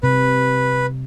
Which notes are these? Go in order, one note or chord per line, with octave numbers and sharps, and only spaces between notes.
C3 B4